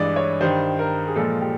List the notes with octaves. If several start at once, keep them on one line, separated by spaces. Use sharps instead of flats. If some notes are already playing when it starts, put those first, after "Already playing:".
Already playing: G2 E3 G#3 D5 D#5
C#5
G2 D#3 G3 C5
A#4
G#4
A#2 F3 G#3 A4
G4